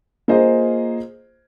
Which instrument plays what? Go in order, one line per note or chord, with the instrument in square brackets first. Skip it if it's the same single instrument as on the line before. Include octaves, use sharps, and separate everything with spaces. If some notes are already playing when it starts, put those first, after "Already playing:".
[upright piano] A#3 F4 G#4 C5 D#5